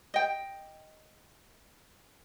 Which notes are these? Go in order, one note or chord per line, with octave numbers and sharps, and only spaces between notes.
D#5 G5